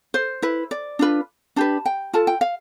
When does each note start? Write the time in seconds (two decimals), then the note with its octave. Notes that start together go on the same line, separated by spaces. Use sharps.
0.14 C5
0.42 E4 B4
0.71 D5
0.99 D4 F4 B4
1.56 D4 G4 B4 A5
1.86 G5
2.13 F4 A4 A5
2.27 G5
2.41 F5